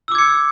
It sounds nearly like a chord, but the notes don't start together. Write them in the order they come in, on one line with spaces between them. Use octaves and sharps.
E6 D6 G#6 C#7